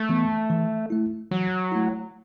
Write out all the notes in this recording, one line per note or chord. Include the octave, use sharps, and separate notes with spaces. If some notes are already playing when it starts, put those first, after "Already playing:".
Already playing: A3
E3 B3
E3
A3 E4
E3 F#3
A3 E4